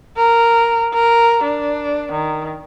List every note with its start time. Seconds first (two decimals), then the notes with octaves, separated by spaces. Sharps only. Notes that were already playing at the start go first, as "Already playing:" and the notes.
0.17 A#4
0.94 A#4
1.43 D4
2.12 D#3